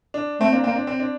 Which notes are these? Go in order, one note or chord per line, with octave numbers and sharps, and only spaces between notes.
D4
A3 C4
A#3 D4
A#3 C4
D4
C4
D4